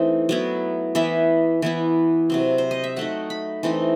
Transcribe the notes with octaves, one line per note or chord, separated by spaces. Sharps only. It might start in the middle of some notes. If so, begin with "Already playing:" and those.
Already playing: E3 A3 C4 D#4
F#3 B3 E4
E3 B3 E4 E5
E3 B3 E4
C3 F#3 C4
C5
D#5
E5
F#3 A3 D#4 F#5
B5
E3 A3 C4 D#4